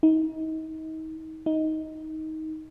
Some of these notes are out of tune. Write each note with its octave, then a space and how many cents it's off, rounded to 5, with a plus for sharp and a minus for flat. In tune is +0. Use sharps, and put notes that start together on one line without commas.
D#4 +30
D#4 +15